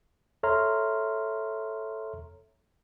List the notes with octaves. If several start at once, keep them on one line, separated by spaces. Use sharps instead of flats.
A4 C#5 E5 A#5 C6 F6